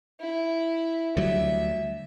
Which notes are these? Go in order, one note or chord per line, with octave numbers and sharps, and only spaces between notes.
E4
D2 F#3 G3 E5